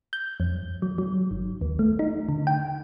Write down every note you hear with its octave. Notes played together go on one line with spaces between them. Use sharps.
G6
F2
F#3
F#3
G1
D#2
A3
D#4
D3
G5